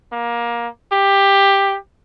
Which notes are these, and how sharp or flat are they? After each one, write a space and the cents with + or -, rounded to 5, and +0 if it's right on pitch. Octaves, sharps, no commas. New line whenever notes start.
A#3 +20
G4 +10